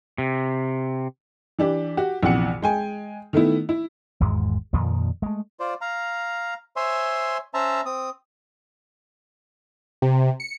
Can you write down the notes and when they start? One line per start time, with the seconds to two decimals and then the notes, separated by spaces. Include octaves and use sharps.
0.18 C3
1.59 E3 D4 G4
1.97 F#4 G4
2.23 A#1 E2 C3 F#5 C#7
2.62 G#3 G5 G#5
3.33 D#3 A3 B3 E4
3.69 E4
4.20 G#1 E2 G#2 G#3
4.73 F2 A#2 D#3 F3
5.22 G#3 A3
5.60 F4 C5 D5
5.81 F5 A#5
6.76 C5 C#5 E5 G#5 C6
7.54 C#4 C5 E5 A5 A#5
7.86 C4 D#6
10.02 C3
10.40 C#7